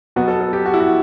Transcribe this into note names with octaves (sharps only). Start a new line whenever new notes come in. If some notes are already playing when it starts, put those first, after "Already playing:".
B2 F#3 B3 F#4
A4
A4
G4
F#4
E4
F#4